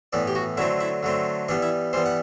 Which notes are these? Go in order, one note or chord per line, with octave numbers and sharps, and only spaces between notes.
A2 E3 B3 D5
G4
F#4
D3 F#3 A3 C4 E4
E4
D3 F#3 A3 C4
E3 G3 B3 D4
E4
E3 G3 B3 C5
F#5